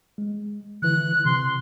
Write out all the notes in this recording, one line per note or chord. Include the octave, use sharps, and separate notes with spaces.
G#3
D3 E3 F#6
C3 C6